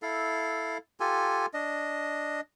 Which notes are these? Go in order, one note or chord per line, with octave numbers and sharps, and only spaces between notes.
E4 A4 F5
F4 G4 A4 G#5
D4 D#5